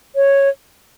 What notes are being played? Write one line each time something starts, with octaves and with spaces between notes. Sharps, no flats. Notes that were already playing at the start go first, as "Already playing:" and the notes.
C#5